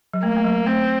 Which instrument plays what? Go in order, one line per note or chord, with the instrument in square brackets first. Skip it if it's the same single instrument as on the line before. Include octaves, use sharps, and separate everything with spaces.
[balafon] F#3
[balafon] A3 [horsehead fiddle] A#3
[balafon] A3
F#3
[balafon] A3 [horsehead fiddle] C4